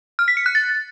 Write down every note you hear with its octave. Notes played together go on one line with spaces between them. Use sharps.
F6
B6
C#7
F#6
A6